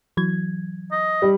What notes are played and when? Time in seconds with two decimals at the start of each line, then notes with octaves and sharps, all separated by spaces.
0.17 E3 F#3 G#6
0.92 D#5
1.22 G3